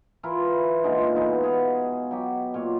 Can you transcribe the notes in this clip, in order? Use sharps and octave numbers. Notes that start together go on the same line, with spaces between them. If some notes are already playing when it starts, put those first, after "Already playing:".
E3 E4 F4 A#4
A#2 D3 G#3 D#4
B2 E3 G#3 D#4
B3 G#4 F5
F#3 G4
A#2 C#5